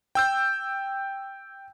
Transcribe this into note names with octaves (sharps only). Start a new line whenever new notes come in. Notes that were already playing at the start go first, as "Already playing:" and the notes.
G5 E6 G6